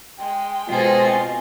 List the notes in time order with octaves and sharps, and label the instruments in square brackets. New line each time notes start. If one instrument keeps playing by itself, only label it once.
[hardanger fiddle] G#3 [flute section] G5 C6
[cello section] B2 F4 D#5 [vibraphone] G#3 C5 [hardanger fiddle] G#4 A4
[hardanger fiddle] C4 [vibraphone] G#5